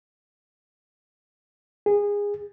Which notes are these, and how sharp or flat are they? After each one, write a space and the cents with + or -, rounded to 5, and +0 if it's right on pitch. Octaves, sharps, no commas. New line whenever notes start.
G#4 -20